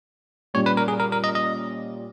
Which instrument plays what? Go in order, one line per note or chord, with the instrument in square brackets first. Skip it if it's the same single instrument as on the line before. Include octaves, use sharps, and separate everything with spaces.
[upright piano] A#2 G3 C#4 G4 [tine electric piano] C#5
[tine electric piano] B4
A#4
G#4
A#4
A#4
D#5
D#5